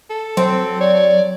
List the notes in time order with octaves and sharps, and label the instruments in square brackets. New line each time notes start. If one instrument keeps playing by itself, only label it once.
[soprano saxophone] A4
[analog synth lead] F#3 [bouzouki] C4
[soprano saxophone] C#5 [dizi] D5